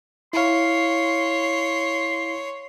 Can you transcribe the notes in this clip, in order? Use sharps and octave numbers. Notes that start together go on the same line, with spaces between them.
E4 C#5 F5 C6